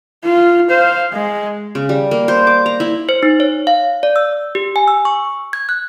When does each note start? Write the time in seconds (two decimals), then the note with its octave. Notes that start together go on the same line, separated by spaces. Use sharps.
0.25 F4
0.70 C5 F5
1.13 G#3
1.75 C#3
1.89 G3
2.11 A#3
2.28 C5
2.47 D6
2.66 A#5
2.80 E4
3.09 C5
3.23 D#4
3.40 C#5
3.67 F5
4.03 D5
4.16 E6
4.55 G4
4.76 G#5
4.88 E6
5.05 C#6
5.53 G#6
5.69 F#6